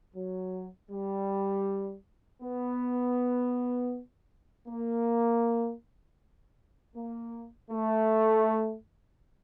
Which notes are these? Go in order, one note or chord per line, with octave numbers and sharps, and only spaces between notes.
F#3
G3
B3
A#3
A#3
A3